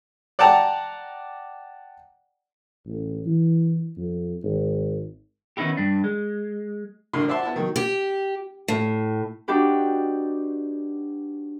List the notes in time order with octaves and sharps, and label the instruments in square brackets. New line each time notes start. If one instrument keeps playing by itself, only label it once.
[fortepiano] D5 F#5 G5 A5 A#5
[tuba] A1
E3
F2
G#1
[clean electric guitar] D#3 B3 C#4 D#4 E4 G4
G2 D4
G#3
[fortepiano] A1 D3 E4 A#4 C6
C5 D5 E5 F#5 A5 C6
B3 E4 A5
D#3 F#3
[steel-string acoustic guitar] G4
A2
[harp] D4 D#4 F#4 G4 B4